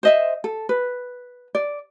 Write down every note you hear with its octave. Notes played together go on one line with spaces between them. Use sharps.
C5 D#5 E5
A4
B4
D5